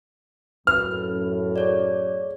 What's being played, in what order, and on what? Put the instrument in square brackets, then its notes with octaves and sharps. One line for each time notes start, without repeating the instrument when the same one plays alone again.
[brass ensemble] F#2 A2 [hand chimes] B4 [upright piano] F6
[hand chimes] G#4 C#5 D5